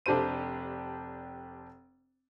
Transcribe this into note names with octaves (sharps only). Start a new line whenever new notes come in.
F1 D4 G4 A4 C5 D#7